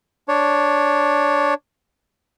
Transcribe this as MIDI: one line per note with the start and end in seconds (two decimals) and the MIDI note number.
0.28 1.54 62
0.28 1.54 73